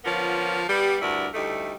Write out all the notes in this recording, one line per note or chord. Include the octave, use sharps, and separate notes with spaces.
D3 F3 B3 C#4 F4 A#4
G3 B3 G4
D2 G2 E4 F#4 A#4 D5
D2 G3 A3 D#4 E4 A4